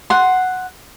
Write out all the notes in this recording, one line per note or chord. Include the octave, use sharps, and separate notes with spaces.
F#5 C6